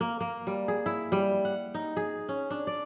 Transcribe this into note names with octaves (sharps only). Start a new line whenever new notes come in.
A#3
A#3
G3
G#4
E4
G3
F#5
D#4
G#4
C#4
D4
D5